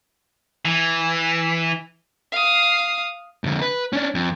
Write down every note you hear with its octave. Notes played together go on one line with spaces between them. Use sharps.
E3
F5 D#6
F2 D3
B4
C#4 D4
F2